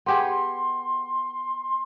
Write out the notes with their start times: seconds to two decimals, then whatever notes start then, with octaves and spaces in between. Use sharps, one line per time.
0.06 B3 G4 G#4 C6